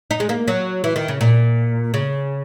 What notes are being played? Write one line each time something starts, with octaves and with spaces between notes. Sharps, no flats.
D#4
G#3
A#3
F#3
E3
D#3
C#3
A#2
C#3